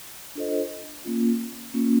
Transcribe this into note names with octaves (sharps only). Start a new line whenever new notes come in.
D4 F4 A4 C5 D#5
A#3 C#4 F4
A#3 C#4 F4